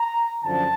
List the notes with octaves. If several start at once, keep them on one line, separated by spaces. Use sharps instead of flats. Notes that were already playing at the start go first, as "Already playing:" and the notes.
Already playing: A#5
F#2 D3 F3 A5